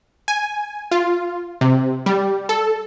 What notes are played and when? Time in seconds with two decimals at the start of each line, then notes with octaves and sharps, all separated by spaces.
0.28 G#5
0.91 F4
1.61 C3
2.06 G3
2.49 A4